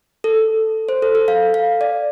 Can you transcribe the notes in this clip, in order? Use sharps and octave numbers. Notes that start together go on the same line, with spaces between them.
A4
C5
A4
A4
F5
F5
D5